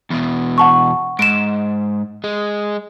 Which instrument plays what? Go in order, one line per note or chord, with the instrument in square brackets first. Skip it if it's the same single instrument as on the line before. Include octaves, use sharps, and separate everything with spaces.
[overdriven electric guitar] E2 B2
[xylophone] F#5 A5 C#6
[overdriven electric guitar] G#2 [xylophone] D7 E7
[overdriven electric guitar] G#3